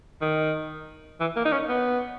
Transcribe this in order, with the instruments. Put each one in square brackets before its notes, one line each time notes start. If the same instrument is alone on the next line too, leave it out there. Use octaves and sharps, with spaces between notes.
[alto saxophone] D#3
E3
A#3
D#4
C#4
B3